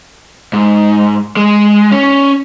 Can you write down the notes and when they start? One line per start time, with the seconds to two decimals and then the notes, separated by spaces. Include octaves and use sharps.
0.53 G#2
1.37 G#3
1.92 C#4